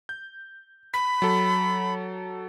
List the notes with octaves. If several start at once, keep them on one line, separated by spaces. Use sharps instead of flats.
G6
B5 B6
F#3 A4